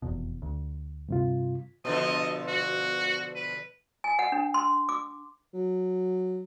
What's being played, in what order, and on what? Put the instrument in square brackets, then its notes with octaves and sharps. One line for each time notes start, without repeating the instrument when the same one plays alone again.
[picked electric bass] F1 E2 B2
D2
[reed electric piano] G2 C3 F4
[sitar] B2 D3 F3 [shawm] D#5
[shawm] F#4
B4
[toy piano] G#5
F#5
D4
C6
D6
[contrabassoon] F#3